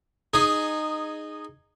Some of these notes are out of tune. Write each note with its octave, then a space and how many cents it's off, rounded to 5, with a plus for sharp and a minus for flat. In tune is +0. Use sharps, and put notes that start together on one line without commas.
D#4 -15 G#4 +0